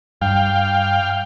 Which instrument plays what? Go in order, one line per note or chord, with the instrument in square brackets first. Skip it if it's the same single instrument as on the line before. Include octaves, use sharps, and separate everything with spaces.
[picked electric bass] G2 [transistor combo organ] F5 G5